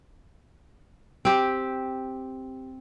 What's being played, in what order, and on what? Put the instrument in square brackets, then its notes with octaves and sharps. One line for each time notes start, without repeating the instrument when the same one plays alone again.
[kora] C4 G4